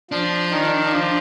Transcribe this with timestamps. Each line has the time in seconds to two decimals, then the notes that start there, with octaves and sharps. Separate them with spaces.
0.11 F3 D4
0.51 D#3
0.90 F3